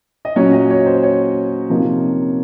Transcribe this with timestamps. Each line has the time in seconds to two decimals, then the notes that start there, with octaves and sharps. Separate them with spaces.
0.25 D#5
0.36 A#2 F#3 C#4 C#5
0.53 D#5
0.70 C#5
0.86 C5
1.03 C#5
1.70 C3 F3 A#3 D#4